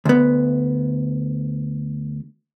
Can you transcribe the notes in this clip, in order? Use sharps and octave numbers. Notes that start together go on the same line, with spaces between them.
D2 B3